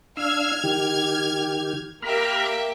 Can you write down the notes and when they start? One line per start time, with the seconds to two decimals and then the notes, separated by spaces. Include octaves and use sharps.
0.17 D4 F5 E6 F6 G#6
0.64 D#3 G4
2.02 A#3 G4 E5 A#5 B5 F6